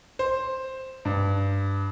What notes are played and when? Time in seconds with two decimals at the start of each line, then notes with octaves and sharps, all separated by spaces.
0.19 C5
1.05 G2